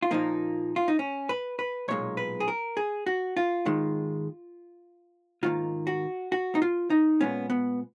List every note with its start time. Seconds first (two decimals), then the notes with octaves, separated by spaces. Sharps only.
0.02 F4
0.11 A#2 F3 A#3 D#4
0.76 F4
0.88 D#4
0.99 C#4
1.29 B4
1.59 B4
1.88 B1 A#2 G#3 C#5
2.17 B4
2.40 G#4
2.48 A#4
2.77 G#4
3.06 F#4
3.37 F4
3.65 G#2 D#3 G#3
5.43 G#2 D#3 A#3 F4
5.87 F#4
6.32 F#4
6.55 D#4
6.62 F4
6.90 D#4
7.21 A#2 G#3 B3 C#4
7.50 B3